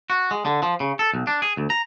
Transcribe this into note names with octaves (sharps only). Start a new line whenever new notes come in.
F#4
G#3
D3
F3
C#3
A4
B1
D4
G#4
D2
A#5